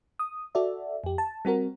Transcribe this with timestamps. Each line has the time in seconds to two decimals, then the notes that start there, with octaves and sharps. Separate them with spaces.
0.19 D#6
0.55 F#4 A4 D5 E5
1.04 F2 G4
1.18 A5
1.45 G3 C4 F#4 A#4